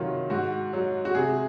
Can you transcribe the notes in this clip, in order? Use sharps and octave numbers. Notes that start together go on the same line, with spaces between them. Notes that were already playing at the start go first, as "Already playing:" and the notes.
Already playing: C3 D#3 F#3 F4
G#2 F#4
F#3
F#4
C3 G#4